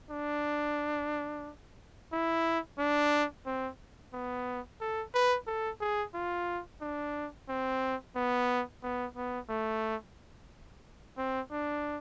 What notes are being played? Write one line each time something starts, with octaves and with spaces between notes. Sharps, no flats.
D4
E4
D4
C4
B3
A4
B4
A4
G#4
F4
D4
C4
B3
B3
B3
A3
C4
D4